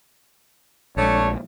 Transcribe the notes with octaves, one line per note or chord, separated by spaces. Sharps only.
A#1 G#3 A3 D4 C#5